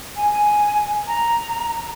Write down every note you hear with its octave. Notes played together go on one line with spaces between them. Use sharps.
G#5
A#5